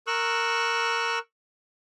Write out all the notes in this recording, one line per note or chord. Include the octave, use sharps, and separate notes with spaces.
A#4 C#6 E6 F#6